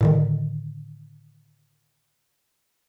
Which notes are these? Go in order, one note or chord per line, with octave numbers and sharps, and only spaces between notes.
A2 D3 D#3